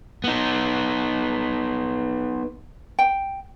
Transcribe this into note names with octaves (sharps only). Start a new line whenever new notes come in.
B3 D#4
G5